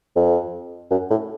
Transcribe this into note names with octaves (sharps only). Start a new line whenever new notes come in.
F2
F#2
A2